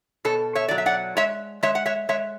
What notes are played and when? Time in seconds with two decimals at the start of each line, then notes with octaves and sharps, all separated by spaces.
0.25 B2 A4 C#5
0.55 C#5 E5
0.68 F#3 D5
0.78 E5
0.86 D5 F#5
1.17 G#3 C#5 E5
1.63 G#3 C#5 E5
1.75 F#5
1.86 C#5 E5
2.09 G#3 C#5 E5